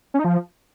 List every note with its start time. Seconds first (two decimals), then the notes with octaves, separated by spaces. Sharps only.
0.14 C#4
0.19 D#4
0.25 F3